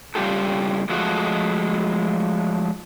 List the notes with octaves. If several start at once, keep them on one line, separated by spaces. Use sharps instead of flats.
C#3 G3 A#3 F4 G4 A4
F3 F#3 G#3 A3 F#4